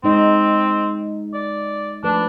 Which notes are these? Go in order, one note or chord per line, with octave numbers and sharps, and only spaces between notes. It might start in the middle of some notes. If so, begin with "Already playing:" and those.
G#3 C4 D#4 D#5
D5
F3 A3 D4 B4